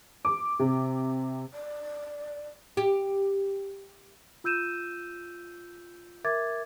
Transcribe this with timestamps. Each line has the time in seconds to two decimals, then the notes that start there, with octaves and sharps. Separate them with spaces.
0.25 D6
0.59 C3
1.54 D5
2.77 G4
4.44 F4 E6 G6 D#7 E7
6.24 A#4 E5 D6 G#6 A6